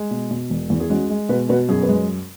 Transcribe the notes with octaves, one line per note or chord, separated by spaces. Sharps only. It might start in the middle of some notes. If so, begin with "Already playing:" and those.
Already playing: G#3
B2
B2
E1
E2
G#4
G#3 C#4 F#4
G#3
B2 F#4 B4
B2 F#4 B4
F#2 G#4
B4
G#3